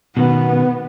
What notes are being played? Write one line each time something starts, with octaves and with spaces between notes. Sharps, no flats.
B2 D#3 B3